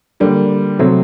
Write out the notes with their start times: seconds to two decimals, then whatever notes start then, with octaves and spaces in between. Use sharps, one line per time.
0.20 D3 G3 A#3
0.79 C3 F#3 A3 C4